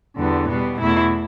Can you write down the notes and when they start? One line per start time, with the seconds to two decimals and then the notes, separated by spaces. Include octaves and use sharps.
0.17 E2 D3 G3 B3
0.48 B2 G3 B3
0.79 E2 B2 A3 E4